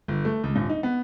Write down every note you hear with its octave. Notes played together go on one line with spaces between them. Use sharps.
G1
A3
C#2
D#1
D#4
B3